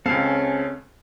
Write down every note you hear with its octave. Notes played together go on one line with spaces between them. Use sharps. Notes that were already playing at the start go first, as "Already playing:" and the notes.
C#2 C4 C#4 G#4 A4 F5